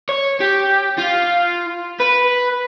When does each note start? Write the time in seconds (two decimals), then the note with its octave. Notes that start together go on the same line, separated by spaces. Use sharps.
0.09 C#5
0.40 G4
0.98 F4
2.00 B4